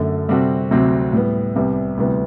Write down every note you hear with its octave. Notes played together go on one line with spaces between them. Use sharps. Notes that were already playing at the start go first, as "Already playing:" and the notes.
Already playing: F#2 D3 A3
C3 G3 C4 F#4 A4
D2 C3 F#3 C4
A2 G3 B3
C2 C3 G3 B3
D2 C3 E3 G3 B3